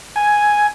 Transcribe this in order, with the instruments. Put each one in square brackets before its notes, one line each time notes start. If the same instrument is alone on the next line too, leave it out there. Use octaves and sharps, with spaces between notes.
[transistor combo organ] G#5